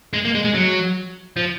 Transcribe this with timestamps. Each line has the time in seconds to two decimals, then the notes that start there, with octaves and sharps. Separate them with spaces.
0.14 G#3
0.25 A#3
0.35 G#3
0.45 G#3
0.55 F#3
1.37 F3